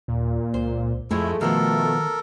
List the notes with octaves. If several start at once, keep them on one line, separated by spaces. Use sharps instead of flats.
D#2 A#2
C#2 C5
F2 F3 G#3 A3 E4
B2 D#3 F3 B3 A4 A#4